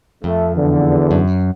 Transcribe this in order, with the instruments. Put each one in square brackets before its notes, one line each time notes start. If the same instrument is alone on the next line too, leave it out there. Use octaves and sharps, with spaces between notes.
[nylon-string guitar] F2 [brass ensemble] A3
[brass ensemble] E2 D3
[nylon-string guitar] F#2